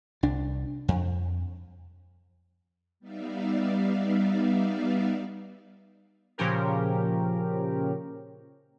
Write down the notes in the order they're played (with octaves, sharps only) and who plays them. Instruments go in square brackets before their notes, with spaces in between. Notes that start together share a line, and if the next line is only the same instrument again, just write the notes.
[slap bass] C2 D4
F2
[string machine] G3 B3 D#4 D5 E5 F5
[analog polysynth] A#2 C#3 F3 C#4 G4 A#4